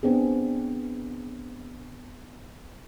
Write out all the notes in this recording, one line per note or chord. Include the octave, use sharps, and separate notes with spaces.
B3 C4 D4 G#4